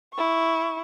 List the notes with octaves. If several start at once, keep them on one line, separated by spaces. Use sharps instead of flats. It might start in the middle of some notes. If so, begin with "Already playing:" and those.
E4 C#6